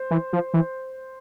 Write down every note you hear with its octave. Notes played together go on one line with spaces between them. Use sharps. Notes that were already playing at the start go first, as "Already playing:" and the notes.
Already playing: C5
E3
F3
E3